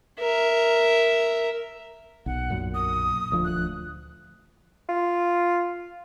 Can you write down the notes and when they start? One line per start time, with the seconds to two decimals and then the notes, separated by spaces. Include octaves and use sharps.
0.19 A#4 E5
2.26 B1 F#5
2.50 B1 F#2 A#2
2.74 D#6
3.30 D#1 D2 F3
3.45 F#6
4.89 F4